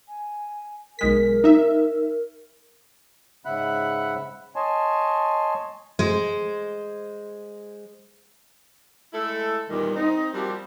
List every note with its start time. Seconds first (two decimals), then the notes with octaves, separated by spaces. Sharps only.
0.08 G#5
0.99 B1 G#3 A#4 B6
1.44 D#4 E5
3.45 G#2 C#3 E5 F#5 B5 F#6
4.56 C#5 D#5 G#5 A5 C6
5.99 G#3 C5
9.14 G#3 A3 E4 A4
9.70 E2 A#2 D#3 G3
9.96 C4 D#4
10.33 F3 G3 A#3 C4 F#4 G4